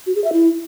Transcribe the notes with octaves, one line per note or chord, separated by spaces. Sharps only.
F#4
G#4
E5
E4